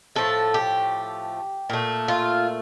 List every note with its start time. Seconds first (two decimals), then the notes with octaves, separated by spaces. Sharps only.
0.16 A2 F3 A3 A4
0.54 G4
1.70 A#2 A3
2.08 F4